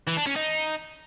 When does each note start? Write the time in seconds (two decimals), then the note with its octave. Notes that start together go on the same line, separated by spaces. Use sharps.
0.08 E3
0.17 D4
0.27 C#4
0.36 D#4